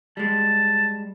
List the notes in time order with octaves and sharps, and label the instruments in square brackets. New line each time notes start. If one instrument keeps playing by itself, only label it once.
[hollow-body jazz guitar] G3 G#3 [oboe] A5